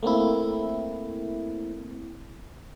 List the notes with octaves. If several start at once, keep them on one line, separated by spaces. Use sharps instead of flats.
A3 A#3 C4 E4